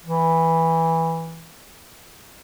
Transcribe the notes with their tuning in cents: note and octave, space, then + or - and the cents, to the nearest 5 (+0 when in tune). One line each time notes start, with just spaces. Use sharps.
E3 -10